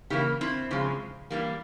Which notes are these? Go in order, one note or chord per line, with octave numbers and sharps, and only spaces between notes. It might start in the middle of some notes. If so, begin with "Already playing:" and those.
C#3 E3 A#3 E4 G4
C4 E4
C#3 F3 G#3
E3 G3 A#3